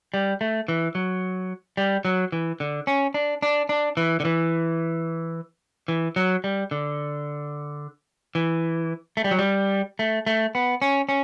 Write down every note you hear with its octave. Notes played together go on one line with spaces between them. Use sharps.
G3
A3
E3
F#3
G3
F#3
E3
D3
C#4
D4
D4
D4
E3
D3
E3
E3
F#3
G3
D3
E3
A3
G3
F#3
G3
A3
A3
B3
C#4
C#4